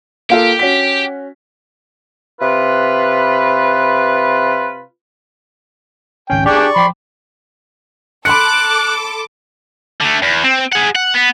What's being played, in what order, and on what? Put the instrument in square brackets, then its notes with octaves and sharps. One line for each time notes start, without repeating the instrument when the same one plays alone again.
[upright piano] A#3 F4 A4 [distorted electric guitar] G4
[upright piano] C#4 F#4 B6
[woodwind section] C3 F4 B4
[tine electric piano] G#1 C#2 C#4 [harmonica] G5
[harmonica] D4 G#4 G5 [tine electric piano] G4 [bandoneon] D5 C#6
[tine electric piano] F3 G5 D6 [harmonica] B5 C6
[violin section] A4 A5 D6 [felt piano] B5 C6 C#7 [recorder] F#6
[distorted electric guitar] D3 A3
E2
C4
G#4 F#5
F#5
B3